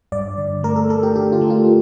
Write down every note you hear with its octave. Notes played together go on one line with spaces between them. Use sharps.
G2 D5
D3
A3 A#4
A4
A3 A4
G4
D3 G4
F4
A3
F4